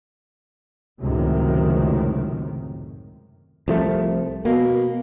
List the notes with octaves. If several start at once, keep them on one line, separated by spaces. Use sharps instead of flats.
C#2 F#2 A2 C3 D#3
C2 F3 A3
B2 A#3